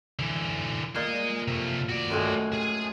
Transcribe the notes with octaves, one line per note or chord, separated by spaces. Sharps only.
D3 E3
A#2 G#4 D#5
C3 A3
F#4 D5
F#2 A2 G#3
G#4 G#5